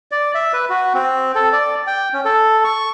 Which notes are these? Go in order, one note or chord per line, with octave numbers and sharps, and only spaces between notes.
D5
E5
B4
F#4
C4
A4
D5
G5
C#4
A4
C#6